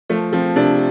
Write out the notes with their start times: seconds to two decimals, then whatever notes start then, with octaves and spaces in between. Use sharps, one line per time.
0.10 F3 A3
0.33 F3 C4
0.56 C3 D4